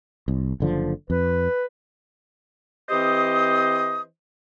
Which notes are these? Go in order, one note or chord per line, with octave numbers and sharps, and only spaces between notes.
C2
F#1 D3 F3
F2 B4
E3 C4 G4 C5 D#5 D#6